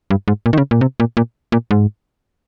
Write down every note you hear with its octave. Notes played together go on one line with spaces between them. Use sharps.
G2
G#2
A#2
D#3
C#3
A#2
C3
A#2
A#2
A#2
G#2